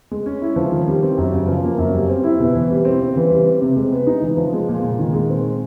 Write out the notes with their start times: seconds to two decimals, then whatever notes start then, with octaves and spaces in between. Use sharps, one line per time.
0.11 G#3
0.26 C#4
0.42 E4
0.56 F3
0.72 D#3
0.88 G3
1.03 C4
1.18 F#2
1.33 C#3
1.48 F3
1.64 A#3
1.78 F#2
1.94 G3
2.09 C4
2.24 E4
2.39 B2
2.55 E3
2.71 G3
2.85 C4
3.01 C#3
3.16 E3
3.30 G3
3.47 C4
3.62 C3
3.76 G#3
3.91 B3
4.07 D#4
4.22 E3
4.37 F3
4.53 G#3
4.68 A#2
4.83 A#2
4.99 D#3
5.14 G#3
5.30 C4